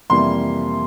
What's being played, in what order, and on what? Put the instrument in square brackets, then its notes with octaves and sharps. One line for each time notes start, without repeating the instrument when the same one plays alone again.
[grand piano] F2 C3 E3 G3 A#3 C6